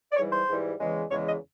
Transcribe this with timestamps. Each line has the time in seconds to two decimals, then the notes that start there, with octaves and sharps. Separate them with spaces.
0.12 D5
0.17 G#2 E3 G3 C#5
0.33 C5
0.49 G#2 E3 G3
0.80 E2 C#3 E3 G#3
1.11 E2 C#3 E3 G#3 C#5
1.27 D#5